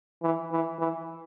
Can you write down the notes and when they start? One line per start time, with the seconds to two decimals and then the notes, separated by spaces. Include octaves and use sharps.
0.23 E3
0.52 E3
0.79 E3